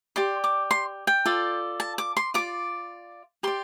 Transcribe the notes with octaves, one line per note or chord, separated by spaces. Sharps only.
G4 D5 C6
D6
C6
G5
F4 A4 D5
A5
D6
C6
F4 D5 D6
G4 D5 C6